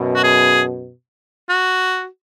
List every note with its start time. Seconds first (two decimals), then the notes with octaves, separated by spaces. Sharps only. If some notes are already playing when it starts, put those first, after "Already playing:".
Already playing: F#2 B2
0.15 F#4
0.24 G#4
1.50 F#4